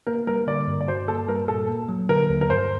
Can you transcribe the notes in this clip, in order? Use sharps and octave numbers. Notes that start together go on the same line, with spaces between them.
A#3 A#4
G3 A#4
D3 D5
G2
D5
F#4 C5
A#3 A4
G3 A#4
A#2 A4
A#3
F#3
D3 A#4
D#2
A#4
G2 C5